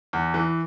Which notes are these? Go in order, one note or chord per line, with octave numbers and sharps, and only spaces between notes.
E2
E3